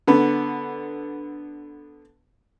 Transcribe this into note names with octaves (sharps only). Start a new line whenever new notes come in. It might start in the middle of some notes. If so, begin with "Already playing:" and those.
D3 B3